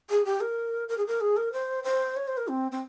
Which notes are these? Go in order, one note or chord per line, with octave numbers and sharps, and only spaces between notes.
G#4
G4
A#4
A#4
G#4
A#4
G#4
A#4
C5
C5
C#5
C5
A#4
C4
C4